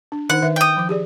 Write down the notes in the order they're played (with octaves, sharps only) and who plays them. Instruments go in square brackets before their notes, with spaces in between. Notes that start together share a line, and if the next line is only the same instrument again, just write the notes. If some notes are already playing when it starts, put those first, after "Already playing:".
[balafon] D4
[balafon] D#3 D#4 C5 [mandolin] F#5
[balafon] D#3 B4 E5
[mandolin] G5 D#6
[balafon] F3 D6
G4 G#4 D5